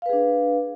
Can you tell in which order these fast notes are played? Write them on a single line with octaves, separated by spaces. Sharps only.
F5 B4 G#4 D4